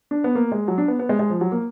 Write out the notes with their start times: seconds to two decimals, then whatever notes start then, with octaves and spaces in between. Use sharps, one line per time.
0.11 D4
0.24 B3
0.35 A#3
0.52 G#3
0.68 F#3
0.78 D4
0.88 B3
0.99 B3
1.09 G#3
1.19 G#3
1.30 F3
1.41 F#3
1.52 A#3